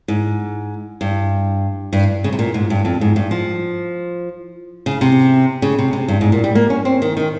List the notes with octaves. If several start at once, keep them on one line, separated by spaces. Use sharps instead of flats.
G#2
G2
G2
C#3
C3
A#2
G#2
G2
F2
G#2
G2
F3
C#3
C3
C#3
C3
C3
G2
G#2
A#2
G3
A#3
C#4
C4
D#3
D#3